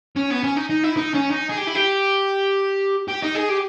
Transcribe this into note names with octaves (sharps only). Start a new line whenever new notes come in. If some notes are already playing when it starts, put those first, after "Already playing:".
C#4
B3
C#4
D#4
D#4
E4
D#4
C#4
D#4
G#4
G4
E4
G4
G4
D#4
G#4
G4